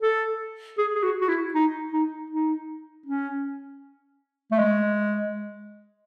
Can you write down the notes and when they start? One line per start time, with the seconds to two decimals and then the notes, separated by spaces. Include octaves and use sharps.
0.02 A4
0.78 G#4
0.95 G#4
1.03 F#4
1.22 F#4
1.29 E4
1.54 D#4
1.93 D#4
2.31 D#4
3.06 C#4
4.52 A3
4.59 G#3